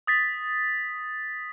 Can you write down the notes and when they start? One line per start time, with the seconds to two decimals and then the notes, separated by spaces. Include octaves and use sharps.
0.07 D#6 A6 B6